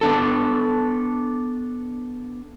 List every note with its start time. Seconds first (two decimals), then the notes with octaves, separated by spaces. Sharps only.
0.01 B3 D4 A4